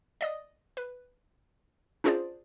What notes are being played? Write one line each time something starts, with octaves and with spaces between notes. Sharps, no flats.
D5 D#5 D#6
B4
C#4 D4 F4 G#4 C5 D5